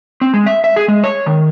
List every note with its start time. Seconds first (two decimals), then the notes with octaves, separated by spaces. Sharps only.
0.21 C4
0.34 G#3
0.46 E5
0.64 E5
0.76 G#4
0.88 G#3
1.04 C#5
1.26 D#3